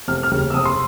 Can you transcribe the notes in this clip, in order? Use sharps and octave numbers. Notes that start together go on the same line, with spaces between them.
F1 F6
F6
D#2 C#3
E6
F1 D#6
C6